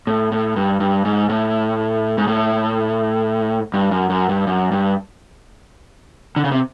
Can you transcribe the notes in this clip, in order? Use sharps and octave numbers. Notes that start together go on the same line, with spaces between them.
A2
A2
G2
G2
G#2
A2
G#2
A2
G2
F#2
F#2
G2
F#2
G2
D3
C#3
C3